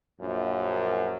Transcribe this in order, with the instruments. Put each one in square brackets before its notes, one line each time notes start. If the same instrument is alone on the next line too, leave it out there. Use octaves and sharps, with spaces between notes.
[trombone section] A#1 F#2